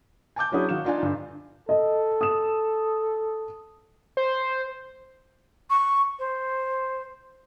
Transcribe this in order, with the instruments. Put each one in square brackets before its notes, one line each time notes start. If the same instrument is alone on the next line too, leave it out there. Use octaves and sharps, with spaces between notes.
[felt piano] G#5 A5 D6 G6
F#3 C#4 D4 E4 F#4 G#4
D#3 F#4 F5 E7
D4 D#4 F4 D5 F5 G#5
G2 D3
[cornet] A4 [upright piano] D#5
[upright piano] D#6 E7
[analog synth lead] C5
[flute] C#6
C5